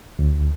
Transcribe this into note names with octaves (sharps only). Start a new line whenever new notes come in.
D2